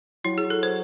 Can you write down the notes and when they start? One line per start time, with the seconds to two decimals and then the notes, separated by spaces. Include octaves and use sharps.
0.25 F#3 E4
0.38 G#4
0.50 A4
0.63 C5